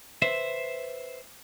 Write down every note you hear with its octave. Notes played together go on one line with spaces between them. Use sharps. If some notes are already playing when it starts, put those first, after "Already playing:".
B4 C5 E5